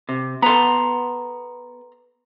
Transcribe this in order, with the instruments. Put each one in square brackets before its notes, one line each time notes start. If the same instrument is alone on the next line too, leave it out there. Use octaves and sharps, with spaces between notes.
[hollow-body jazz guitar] C3
[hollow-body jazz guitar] B3 A4 [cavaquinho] A#5 C6